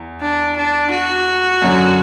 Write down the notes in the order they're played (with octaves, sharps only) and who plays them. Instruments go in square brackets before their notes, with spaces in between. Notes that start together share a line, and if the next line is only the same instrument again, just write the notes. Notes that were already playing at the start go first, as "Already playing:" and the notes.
Already playing: [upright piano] E2
[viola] D4
D4
F#4
[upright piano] F#2 D3 F#3